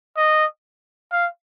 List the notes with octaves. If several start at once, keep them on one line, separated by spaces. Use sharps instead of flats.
D#5
F5